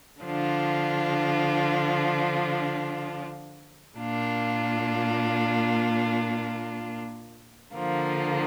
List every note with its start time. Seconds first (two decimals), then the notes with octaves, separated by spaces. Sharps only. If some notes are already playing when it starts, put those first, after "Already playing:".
0.22 D3 F3 D4 F4
3.98 A#2 A#3 D4 F4
7.74 D3 F3 A#3 F4